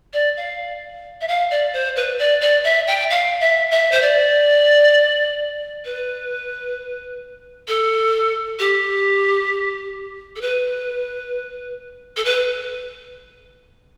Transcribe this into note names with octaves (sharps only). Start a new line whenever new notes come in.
D5
F5
E5
F5
D5
C5
B4
D5
D5
E5
G5
F5
E5
E5
C5
D5
B4
A4
G4
A4
B4
A4
B4